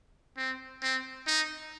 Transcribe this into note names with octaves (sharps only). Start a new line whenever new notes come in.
C4
C4
D#4